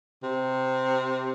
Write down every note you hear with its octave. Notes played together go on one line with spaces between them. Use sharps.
C3